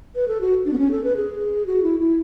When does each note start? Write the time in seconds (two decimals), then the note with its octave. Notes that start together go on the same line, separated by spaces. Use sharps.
0.16 B4
0.28 A4
0.41 F#4
0.66 D4
0.73 B3
0.78 C#4
0.91 A4
1.04 B4
1.16 G#4
1.66 F#4
1.83 E4
2.00 E4